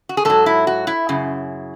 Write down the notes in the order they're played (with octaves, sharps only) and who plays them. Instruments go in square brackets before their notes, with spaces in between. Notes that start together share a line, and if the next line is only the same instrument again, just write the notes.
[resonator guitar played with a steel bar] F#4
G#4
G#2 F#3 A4
E4
F#4
E4
F#2 C#3